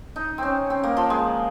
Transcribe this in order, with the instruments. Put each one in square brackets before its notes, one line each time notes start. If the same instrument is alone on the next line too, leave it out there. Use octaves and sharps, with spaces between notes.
[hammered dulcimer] D#4
C4 C#4
C4
A#3
F3
G#3